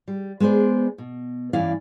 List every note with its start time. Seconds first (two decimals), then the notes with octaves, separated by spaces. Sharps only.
0.08 G3
0.40 G#3 B3 D4 C5 D5
0.98 B2
1.53 G2 E3 C#4 E4 D5 F5